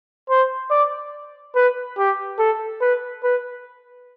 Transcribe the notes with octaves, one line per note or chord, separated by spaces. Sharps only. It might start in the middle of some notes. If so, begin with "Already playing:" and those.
C5
D5
B4
G4
A4
B4
B4